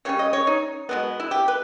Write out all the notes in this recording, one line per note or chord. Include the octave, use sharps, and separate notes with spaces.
C#3 G3 C#4 C#5
D#5
C#5
D#4
B2 G#3 B3
E4
G4
B4